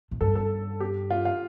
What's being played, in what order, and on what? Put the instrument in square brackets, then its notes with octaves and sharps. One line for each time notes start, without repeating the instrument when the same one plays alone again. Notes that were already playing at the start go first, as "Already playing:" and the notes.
[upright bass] A2
[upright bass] G2 [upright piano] A4
[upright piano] A4
G4
F4
F4